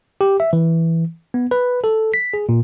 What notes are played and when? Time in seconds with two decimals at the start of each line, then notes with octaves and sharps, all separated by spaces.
0.21 G4
0.40 E5
0.53 E3
1.34 B3
1.51 B4
1.84 A4
2.14 B6
2.34 G#4
2.49 A#2